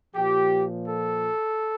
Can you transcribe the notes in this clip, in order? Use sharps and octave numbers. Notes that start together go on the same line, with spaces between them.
A#2 F3 G4
A4